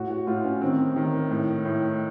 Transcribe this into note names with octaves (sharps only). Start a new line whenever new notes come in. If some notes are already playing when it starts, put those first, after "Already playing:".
Already playing: A2 F#4
F#4
A2 F4
C#4
D#3 C4
D#3
A2
A2